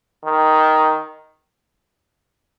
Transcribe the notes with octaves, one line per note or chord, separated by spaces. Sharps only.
D#3